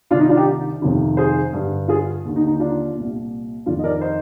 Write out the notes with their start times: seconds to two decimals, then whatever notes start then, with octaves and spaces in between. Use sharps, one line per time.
0.11 C2 C3 D#3 D4 F4
0.20 D#4
0.29 D4 F4
0.37 D#4 G4
0.82 F2 C3 D#3
1.17 G#4 C5
1.53 G2 D3
1.88 F4 G#4
2.25 D#2 D3
2.36 D#4
2.47 D#4
2.60 D4 F4
2.95 C2 A#2
3.66 F2 D#3 D4 F4
3.79 D#5
3.84 A#4 D5
4.01 C5 D#5